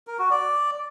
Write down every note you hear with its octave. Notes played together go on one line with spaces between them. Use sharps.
A#4
F#4
D5